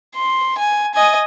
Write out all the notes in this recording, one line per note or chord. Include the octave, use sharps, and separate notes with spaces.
C6
G#5
D#5 G#5